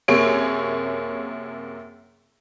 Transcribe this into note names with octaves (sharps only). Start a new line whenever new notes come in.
F#2 C3 A#3 G#4 C#5 D7